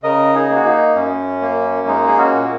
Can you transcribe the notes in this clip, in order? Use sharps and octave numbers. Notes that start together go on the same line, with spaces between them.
C#3 A#4 D#5
D#4 G#4
A#3
F#4
D#4
F#2 C#4
A#3
G#3 D#4
G#4
C#4 F#4
A#2